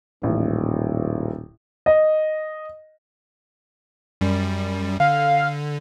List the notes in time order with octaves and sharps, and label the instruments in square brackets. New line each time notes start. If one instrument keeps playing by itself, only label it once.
[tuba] D#1 [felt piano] A1
[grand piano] D#5
[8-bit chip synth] F#2 G3
[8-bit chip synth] D3 [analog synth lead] F5